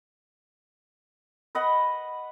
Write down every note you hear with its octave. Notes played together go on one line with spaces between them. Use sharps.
B4 D#5 F#5